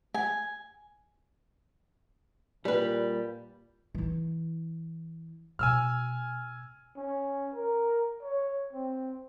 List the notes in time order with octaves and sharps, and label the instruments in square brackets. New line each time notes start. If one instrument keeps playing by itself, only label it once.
[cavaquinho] G#5
[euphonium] A#2 [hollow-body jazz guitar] G3 B4
[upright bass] E3 E4
[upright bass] B2 [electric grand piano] G#5 E6 F6
[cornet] C#4
A#4
C#5
C4